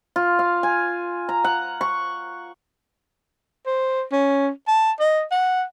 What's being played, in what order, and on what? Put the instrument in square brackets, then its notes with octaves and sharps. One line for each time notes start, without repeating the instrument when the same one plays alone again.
[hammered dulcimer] F4
F5
G#5
A#5
F#5
C#6
[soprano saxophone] C5
C#4
A5
D#5
F#5